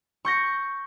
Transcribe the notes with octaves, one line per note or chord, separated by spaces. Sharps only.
C#6 G6 A#6 C#7